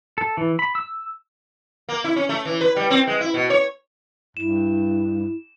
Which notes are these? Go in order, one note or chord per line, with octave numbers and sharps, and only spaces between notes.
A4
E3
B5
E6
A#3
E4
C#4
A3
E3
B4
G3
C4
G#3
E4
B2
C#5
G2 E4 E7